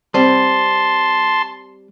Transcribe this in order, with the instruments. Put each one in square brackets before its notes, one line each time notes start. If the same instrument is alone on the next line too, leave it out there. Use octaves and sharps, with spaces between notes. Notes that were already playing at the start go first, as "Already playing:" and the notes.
[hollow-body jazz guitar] G3 C4 [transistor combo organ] A5 C6